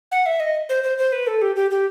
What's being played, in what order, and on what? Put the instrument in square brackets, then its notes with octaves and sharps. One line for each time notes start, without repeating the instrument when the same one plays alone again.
[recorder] F#5
E5
D#5
C5
C5
C5
B4
A4
G4
G4
G4